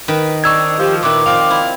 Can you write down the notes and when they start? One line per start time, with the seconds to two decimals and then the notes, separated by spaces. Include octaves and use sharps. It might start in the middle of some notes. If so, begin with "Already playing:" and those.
0.08 D#3 B4
0.44 C4 D4 D#4 C#6 E6 G#6
0.79 F3 G4
1.03 A#2 D#3 E4 B4 D6
1.26 F3 C4 D5 F5
1.51 E4